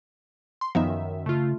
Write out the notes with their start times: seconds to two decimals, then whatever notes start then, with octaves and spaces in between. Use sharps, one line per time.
0.61 C6
0.75 F#2 D#3 F3 B3 D#4 E5
1.26 C#3 A3 F4